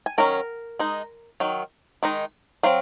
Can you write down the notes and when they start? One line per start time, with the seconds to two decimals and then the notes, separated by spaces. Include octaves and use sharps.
0.06 G#5
0.18 D#3 F#3 C#4 A#4 A#5
0.79 G#3 D#4
1.40 D#3 F#3
2.03 D#3 G#3 D#4
2.63 F#3 C4 F5